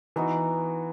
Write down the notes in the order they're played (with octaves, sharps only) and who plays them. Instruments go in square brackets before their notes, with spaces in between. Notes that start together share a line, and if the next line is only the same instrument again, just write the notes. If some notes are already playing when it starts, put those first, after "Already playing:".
[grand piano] E3 [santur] B3 D#4 F#4